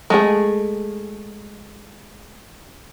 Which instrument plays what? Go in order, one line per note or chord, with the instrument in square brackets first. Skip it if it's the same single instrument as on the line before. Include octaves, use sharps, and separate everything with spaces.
[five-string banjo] G#3 A3 G#4